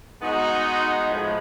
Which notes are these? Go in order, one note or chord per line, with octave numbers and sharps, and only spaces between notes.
G#3 B3 D#4 F#4
A2 F3 G#3